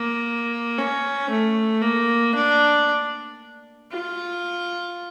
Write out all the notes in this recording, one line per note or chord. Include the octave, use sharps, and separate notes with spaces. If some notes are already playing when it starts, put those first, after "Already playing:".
Already playing: A#3
C#4
A3
A#3
D4
F4